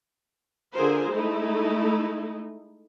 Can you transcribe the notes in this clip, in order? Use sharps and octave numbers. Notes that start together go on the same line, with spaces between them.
D3 F4 G#4 A#4 C5
G#3 A3 D#4 E4